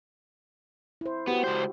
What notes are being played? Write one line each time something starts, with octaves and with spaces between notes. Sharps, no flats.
E4 C5
B3 F#4 G4
C#2 C5